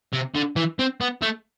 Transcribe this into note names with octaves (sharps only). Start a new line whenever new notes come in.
C3
D3
E3
C4
B3
A3